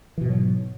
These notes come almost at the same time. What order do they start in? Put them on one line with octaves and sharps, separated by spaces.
E3 B2 G#2 F#3